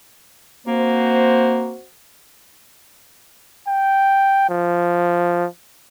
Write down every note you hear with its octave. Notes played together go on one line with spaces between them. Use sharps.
A#3 C4 F#4 C5
G5
F3